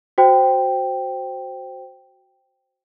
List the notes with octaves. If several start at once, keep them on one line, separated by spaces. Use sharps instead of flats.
F#4 C5 G5